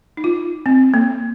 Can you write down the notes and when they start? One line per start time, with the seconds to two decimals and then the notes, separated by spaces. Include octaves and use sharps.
0.17 D#4
0.24 F4
0.66 C4
0.94 A#3